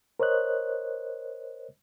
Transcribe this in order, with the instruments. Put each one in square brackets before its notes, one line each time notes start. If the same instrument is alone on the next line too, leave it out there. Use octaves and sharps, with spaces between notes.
[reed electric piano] A#4 C5 C#5 D#5 F#6